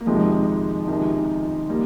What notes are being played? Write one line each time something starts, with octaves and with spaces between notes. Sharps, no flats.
A#3
F2 C3 D#3 F3 G#3
C#2 C3 D#3
G3 A#3